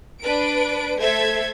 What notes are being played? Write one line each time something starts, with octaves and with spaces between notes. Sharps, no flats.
D4 B4 D7
A3 A4 C5 E5 G#6